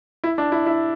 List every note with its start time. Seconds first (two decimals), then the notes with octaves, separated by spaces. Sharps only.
0.24 E4
0.38 D4
0.52 E4
0.66 E4